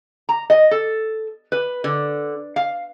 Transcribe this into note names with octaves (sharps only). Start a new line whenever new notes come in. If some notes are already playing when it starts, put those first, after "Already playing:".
A#5
D#5
A4
B4
D3
F5